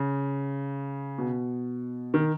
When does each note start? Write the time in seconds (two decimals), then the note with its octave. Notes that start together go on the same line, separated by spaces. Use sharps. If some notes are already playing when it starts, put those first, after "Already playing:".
Already playing: C#3
1.18 B2
2.14 D#3